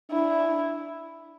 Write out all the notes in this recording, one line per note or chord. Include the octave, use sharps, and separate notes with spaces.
D4 E4